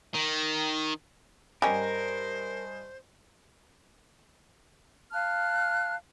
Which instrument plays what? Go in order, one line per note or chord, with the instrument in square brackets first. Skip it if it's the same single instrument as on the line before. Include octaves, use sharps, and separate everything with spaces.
[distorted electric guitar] D#3
[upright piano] G2 D#5 G#5 [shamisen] G3 C#4 [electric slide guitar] A#4 [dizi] C5
[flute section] F5 A5 F6 F#6